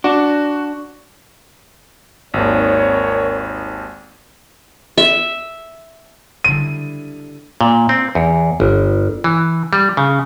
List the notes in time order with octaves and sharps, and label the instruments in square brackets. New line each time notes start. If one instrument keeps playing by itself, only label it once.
[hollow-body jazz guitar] D4 [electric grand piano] F#4
[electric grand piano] G#1 D#2 [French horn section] C4 A#4 C#5
[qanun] E5
[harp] D3 G3 E4 [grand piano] D#7
[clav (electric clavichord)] A#2
C4
E2
G1
E3
G3
C#3